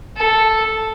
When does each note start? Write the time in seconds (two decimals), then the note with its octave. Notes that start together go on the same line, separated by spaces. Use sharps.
0.17 A4